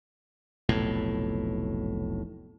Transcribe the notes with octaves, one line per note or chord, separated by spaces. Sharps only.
F1 B1 A2